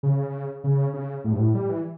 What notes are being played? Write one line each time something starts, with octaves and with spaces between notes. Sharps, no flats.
C#3
C#3
C#3
A2
G2
A2
G3
E3